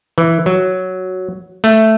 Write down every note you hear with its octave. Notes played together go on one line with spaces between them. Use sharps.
E3
F#3
A3